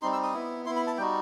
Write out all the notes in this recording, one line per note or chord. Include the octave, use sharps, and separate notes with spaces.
G3 C4 D#4 C6
E6
D#6
B3 E4
B3 E4 C6
B5
A5
G3 D#4 F#4 G5